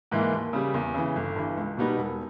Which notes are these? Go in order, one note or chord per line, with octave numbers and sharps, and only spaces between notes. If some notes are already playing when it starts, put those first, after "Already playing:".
G#2 E3 A#3 E4
D#2
C#3 G3
E2
C#3 E3
G1
G2 E3
C#2
B2 G3 B3 D#4
E1